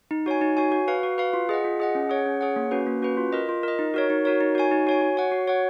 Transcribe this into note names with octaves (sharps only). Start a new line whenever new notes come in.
D#4
F#4 C#5 G#5
D#4
F#4 C#5 G#5
F#4
B4 F5
F#4
B4 F5
F4
G#4 D#5 F#5
F4
G#4 D#5 F#5
C#4
G#4 C#5 F#5
C#4
G#4 C#5 F#5
A#3
C#4 F#4 B4
A#3
C#4 F#4 B4
F4
A#4 D#5
F4
A#4 D#5
D#4
F#4 A#4 C#5
D#4
F#4 A#4 C#5
D#4
F#4 C#5 G#5
D#4
F#4 C#5 G#5
F#4
C#5 F#5
F#4
C#5 F#5